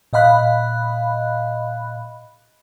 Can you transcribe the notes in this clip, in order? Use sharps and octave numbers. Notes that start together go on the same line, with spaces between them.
A#2 D#5 F5 B5 F#6